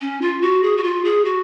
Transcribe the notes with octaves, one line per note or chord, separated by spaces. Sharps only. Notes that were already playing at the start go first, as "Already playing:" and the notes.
C#4
F4
F#4
G#4
F#4
F4
G#4
F#4